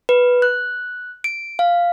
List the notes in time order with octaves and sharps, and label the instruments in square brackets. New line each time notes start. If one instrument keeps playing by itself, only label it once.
[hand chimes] B4
F#6
D7
F5